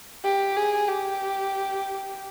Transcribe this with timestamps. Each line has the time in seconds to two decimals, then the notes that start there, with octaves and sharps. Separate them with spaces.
0.25 G4
0.57 G#4
0.88 G4